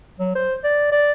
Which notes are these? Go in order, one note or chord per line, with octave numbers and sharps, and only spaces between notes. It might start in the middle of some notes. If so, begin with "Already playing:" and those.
F#3
C5
D5
D5